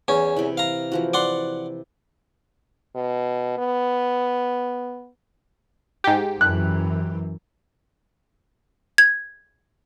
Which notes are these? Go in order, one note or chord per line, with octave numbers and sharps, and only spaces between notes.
E2 C#4
C3 E3
F5 A#5
E3 F3 F#4
D5 F#5 C6
B2
B3
G#2 G4
F#2 E3 F#6
G#6